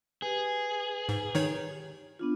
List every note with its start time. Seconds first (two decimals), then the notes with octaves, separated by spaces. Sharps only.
0.22 G4 G#4 B4
1.09 G#2
1.35 D#3 D#4 C#5
2.19 B3 D4 F4